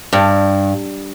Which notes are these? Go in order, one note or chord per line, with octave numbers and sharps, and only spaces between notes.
G2